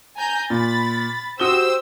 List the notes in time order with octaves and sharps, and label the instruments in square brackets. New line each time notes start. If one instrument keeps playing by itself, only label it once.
[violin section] G#5 A#5 G6
[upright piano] A#2 [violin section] B5 A6
[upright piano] F#4 D#6 G7 [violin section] G4 C5 E6